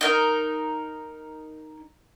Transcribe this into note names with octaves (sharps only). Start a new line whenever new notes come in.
D#4 A#4